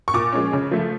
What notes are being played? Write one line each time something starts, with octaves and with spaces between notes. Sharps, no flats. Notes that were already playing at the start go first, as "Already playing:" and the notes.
C#6
A#2 D6
F3 G#3 C#4
C#3
F3 A3